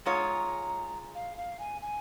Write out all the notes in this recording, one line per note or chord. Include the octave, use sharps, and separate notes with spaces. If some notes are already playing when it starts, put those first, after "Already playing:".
G#2 G#3 F4 C#5 A#5
F5
F5
G#5
G#5